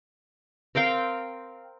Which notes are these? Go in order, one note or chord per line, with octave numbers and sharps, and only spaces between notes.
C4 A#4 F5 G5